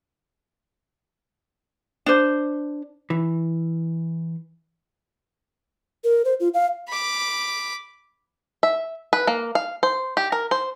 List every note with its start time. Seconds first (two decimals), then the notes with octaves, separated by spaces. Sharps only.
2.06 D4 C5
3.10 E3
6.04 A#4
6.25 C5
6.40 F4
6.54 F5
6.88 B5 D6
8.63 E5
9.13 B4
9.27 A#3
9.55 F5
9.83 C5
10.17 G4
10.32 A#4
10.51 C5